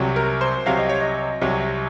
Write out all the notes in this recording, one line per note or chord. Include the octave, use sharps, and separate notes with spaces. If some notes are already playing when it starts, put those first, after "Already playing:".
Already playing: C2 C3 F#3
A#4
C5
C2 C3 F#3 F5
D#5
C#5
D#5
C2 C3 F#3